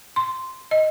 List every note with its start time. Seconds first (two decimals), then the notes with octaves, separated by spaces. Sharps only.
0.16 C6
0.71 D#5